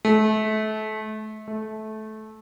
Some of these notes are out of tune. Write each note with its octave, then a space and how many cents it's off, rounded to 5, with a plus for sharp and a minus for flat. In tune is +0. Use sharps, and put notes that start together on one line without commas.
A3 -30
A3 -20